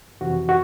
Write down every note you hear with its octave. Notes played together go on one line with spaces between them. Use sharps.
F2 C3 E3 F#4
F#4